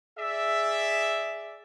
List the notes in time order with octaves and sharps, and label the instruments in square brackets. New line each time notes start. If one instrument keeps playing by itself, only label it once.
[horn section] G#4 D5 E5